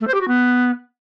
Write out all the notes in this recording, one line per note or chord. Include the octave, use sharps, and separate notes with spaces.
A3
C5
G4
F#4
B3